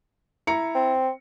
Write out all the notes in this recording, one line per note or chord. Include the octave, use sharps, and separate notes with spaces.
E4 A#5 C#7
C4